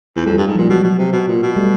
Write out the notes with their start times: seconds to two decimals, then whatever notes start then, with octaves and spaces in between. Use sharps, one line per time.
0.16 E2
0.25 F2 G3 A3
0.37 G2
0.47 G#2
0.55 A#2 F3 G3
0.69 B2 F#3 G#3
0.84 B2
0.98 C3
1.12 B2
1.27 A#2
1.42 B2
1.56 G3 A3